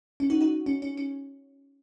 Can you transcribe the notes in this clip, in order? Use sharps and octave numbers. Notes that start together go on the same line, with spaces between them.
C#4
D#4 F#4
D#4 F#4
C#4
C#4
C#4